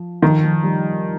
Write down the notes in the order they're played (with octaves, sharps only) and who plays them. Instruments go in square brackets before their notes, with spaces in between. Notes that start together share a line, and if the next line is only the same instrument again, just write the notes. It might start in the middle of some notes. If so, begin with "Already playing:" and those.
Already playing: [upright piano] F3
[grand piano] D#3 [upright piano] F3
[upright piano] F3
G3